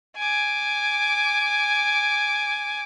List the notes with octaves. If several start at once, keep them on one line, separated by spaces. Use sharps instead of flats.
G#5 D6